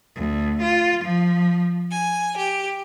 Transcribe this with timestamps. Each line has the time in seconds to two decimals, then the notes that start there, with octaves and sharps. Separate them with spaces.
0.15 D2
0.61 F4
1.03 F3
1.91 G#5
2.37 G4